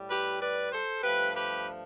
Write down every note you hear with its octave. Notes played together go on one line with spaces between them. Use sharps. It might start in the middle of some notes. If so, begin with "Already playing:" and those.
Already playing: A2 G3
G4 B4
B4 D5
A4 C5
G2 F3 A3 G4 B4
G4 B4